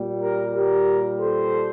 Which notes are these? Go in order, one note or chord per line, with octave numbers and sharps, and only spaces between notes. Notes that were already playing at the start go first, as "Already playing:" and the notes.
Already playing: A#2 G3
G4 A#4
G4 A#4
A4 C5